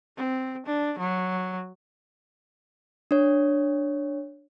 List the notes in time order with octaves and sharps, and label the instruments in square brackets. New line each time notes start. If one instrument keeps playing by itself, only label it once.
[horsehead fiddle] C4
D4
F#3
[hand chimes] D4 C#5